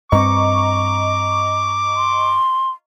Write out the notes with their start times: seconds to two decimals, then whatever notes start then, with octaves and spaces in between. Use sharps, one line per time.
0.12 G2 C4 D#5 A#5 C#6 D6
1.96 C6